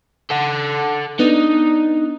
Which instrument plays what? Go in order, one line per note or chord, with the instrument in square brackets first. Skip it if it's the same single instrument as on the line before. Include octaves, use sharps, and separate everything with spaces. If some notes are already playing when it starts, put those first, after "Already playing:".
[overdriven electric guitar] A4 F#5
[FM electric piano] B3 D4 [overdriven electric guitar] D#4